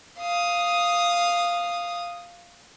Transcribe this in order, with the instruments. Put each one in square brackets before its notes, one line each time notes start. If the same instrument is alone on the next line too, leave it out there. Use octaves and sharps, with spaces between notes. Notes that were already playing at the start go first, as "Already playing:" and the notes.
[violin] F5 D#6